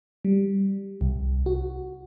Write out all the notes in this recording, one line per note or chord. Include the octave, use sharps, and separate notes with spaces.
G3
C2
F#4